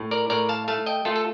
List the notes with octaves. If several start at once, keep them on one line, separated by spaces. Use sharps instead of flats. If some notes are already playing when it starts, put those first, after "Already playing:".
Already playing: A2
A#4 D5
A2 A#4 D5
F5 A5
A3 F5 A5
D#5 G5
A3 F4 A4
A4